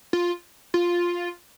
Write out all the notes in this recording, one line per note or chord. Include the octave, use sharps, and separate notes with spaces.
F4
F4